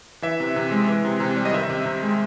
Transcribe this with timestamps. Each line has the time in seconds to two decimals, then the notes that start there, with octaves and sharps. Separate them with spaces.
0.22 E3 E5
0.40 C3
0.56 C3
0.71 G#3
0.88 E3
1.05 C3
1.20 C3
1.36 G3
1.45 D#5
1.53 D#3 E5
1.70 C3
1.86 C3
2.03 G#3